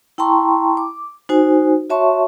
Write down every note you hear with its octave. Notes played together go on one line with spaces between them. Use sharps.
E4 G5 A5 A#5 C6 C#6
D6
D#4 F#4 C5 G#5
F#4 C#5 E5 A5 C6 C#6